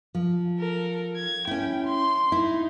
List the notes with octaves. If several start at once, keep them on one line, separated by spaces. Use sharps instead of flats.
F3
A4 A#4
G#6
C#4 E4 G5
C6
D#4 E4